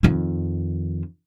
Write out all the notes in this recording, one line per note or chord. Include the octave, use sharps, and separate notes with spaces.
F2 D#3